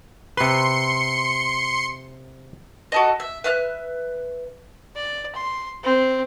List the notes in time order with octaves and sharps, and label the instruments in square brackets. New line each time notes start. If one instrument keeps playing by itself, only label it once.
[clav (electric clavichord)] C3 B4 [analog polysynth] C6 C#7
[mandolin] F#4 A4 D#5
E5
B4 E5 F6 F#6
[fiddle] D5
C6
C4